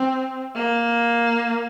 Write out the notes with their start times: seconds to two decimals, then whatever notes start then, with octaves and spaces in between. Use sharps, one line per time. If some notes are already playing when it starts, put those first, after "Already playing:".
Already playing: C4
0.56 A#3